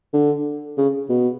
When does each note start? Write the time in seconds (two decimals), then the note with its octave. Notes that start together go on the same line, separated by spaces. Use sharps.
0.13 D3
0.77 C#3
1.09 B2